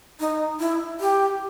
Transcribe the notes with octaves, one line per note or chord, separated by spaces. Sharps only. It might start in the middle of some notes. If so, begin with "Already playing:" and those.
D#4
E4
G4